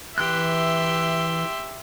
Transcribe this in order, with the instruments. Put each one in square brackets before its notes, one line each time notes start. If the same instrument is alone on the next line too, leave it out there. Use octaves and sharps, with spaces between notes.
[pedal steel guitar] E3 F#6 [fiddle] G4 C6 [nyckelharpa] E5